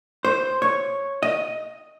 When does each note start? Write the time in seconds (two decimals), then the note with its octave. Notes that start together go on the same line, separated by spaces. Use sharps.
0.25 C5
0.62 C#5
1.23 D#5